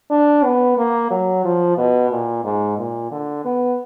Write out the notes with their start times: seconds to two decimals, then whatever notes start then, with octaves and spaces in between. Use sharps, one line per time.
0.11 D4
0.44 B3
0.78 A#3
1.11 F#3
1.45 F3
1.78 B2
2.11 A#2
2.44 G#2
2.78 A#2
3.11 D3
3.45 B3